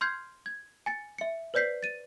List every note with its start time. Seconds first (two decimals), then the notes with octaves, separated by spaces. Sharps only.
0.01 C6 F6 G6 G#6 C7
0.46 G#6
0.86 G#5 A6 C#7
1.18 E5 C#7
1.54 B4 C5 D5 G6 B6 C7
1.83 A6 D#7